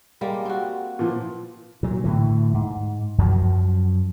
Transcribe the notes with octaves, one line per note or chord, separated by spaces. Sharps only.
G3 G#3 A#3
C4 F#4
A#2 E3 F3
A#2 F#3
A2 D3 E3
G#2
F#2 F3 F#3